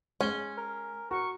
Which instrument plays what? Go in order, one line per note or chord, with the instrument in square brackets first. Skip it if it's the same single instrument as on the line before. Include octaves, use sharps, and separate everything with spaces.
[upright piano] G#3 G7 [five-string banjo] C#4
[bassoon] A#4
[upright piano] F#4 [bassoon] A#4 [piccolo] C#6